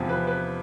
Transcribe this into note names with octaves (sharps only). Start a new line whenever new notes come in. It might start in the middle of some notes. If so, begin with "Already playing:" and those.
Already playing: E2 C3 F3
B4
B4